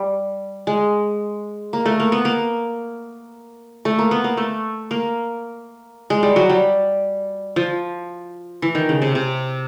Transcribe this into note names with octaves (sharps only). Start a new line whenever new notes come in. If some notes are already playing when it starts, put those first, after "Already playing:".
Already playing: G3
G#3
A#3
A3
A#3
B3
A#3
A3
A#3
B3
A#3
A3
A#3
G#3
G3
F#3
G3
F3
E3
D#3
C#3
C3
C3